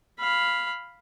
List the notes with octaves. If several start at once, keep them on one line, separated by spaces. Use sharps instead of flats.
F5 B5